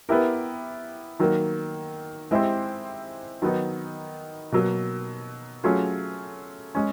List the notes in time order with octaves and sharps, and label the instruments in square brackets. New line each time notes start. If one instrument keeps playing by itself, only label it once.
[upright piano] B3 E4 G4 A#4
D#3 F#3 A#3
G#3 C4 E4 G4 C5
D#3 F#3 B3 D#4
B2 F#3 A#3
F#3 A3 C#4 F4 G#4
G#3 C#4